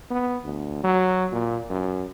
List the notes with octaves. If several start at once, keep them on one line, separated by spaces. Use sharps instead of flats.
B3
D2
F#3
A#2
F#2